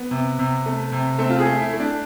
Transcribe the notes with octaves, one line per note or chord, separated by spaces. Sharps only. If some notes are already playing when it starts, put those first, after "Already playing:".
Already playing: B3
C3
C3
A3
C3
A3 C4
F4
G#4
A3
E4
A3
D4